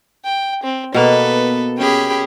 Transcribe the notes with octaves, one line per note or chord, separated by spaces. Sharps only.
G5
C4
B2 A#3 B3 A4 B4
C#4 G4 G#4 G5 B5